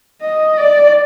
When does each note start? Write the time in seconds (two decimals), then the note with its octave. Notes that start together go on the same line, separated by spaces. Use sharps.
0.22 D#5
0.57 D5